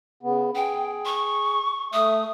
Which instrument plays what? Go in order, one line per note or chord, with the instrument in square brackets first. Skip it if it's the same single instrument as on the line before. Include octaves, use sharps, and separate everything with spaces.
[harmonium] C#3 B3
[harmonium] G#4 [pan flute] G5
[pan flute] C#6
[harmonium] A3 [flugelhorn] E5 [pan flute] D#6